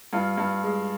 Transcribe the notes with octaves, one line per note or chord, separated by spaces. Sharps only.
G2 F4
G2
G#3